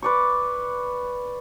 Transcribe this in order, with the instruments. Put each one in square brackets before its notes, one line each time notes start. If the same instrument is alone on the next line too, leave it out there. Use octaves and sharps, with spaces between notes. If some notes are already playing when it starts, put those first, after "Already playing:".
[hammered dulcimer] B4 D5 C#6